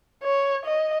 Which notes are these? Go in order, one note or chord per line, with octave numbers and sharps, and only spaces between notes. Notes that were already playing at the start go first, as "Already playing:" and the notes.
C#5
D#5